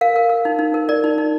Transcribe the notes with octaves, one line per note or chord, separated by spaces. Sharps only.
A#4 F5
A#4
A#4
D#4
D#4
A#4
A#4 D5
D#4
D#4